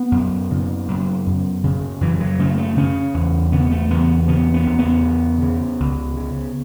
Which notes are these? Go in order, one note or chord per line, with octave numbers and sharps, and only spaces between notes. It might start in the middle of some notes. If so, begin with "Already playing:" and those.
Already playing: B3
F#2
C#3
F#2
F#2
C#3
F#2 E3
F#3
C#3 A3
A3
C#3 C#4
E2
C#3 B3
A3
E2 B3
C#3 B3
B3
E2
B3
C#3
C#3
C#2
C#3